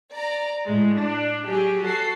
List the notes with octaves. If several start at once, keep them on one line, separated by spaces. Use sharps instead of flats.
D5 A#5
A2 G#3
D4
F#3 G4 G#4
F#4 A4 C7